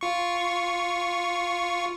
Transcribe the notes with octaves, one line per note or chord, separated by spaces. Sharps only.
F4 C#6